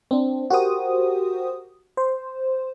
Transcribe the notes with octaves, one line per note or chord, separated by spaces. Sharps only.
C4 D4
F#4 G4 A#4 C5 D#6
C5